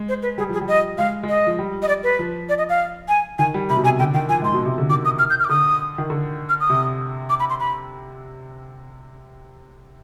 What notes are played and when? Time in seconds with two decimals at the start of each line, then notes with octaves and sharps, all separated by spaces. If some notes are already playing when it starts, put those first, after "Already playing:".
Already playing: G#3
0.09 C5
0.23 B4
0.38 G3 G#4
0.49 F3 G#4
0.61 G3
0.68 D#5
0.98 G#3 F5
1.23 G#3
1.29 D#5
1.47 F3
1.59 G3
1.82 D#5
1.88 D5
2.03 B4
2.19 F3
2.49 D5
2.58 D#5
2.69 F5
3.08 G#5
3.39 D#3 G#5
3.54 G3
3.69 C3 B5
3.77 B2
3.83 C3 G#5
3.99 D3 G5
4.14 D#3 G5
4.29 F3 G#5
4.42 G#2 C6
4.53 B2
4.65 C3
4.78 D3
4.90 D#3 D6
5.05 D#6
5.19 F6
5.30 G6
5.40 F6
5.45 D6
5.49 D3 D#6
5.98 D#3
6.10 D3
6.49 F6
6.60 D#6
6.70 C3
7.30 D6
7.40 B5
7.50 C6
7.60 B5